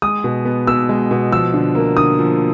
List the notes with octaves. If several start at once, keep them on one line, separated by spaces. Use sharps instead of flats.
G#3 D#6
B2
B3
B2 E6
G#3
B2
F3 E6
D3
A#3
D3 D#6
F3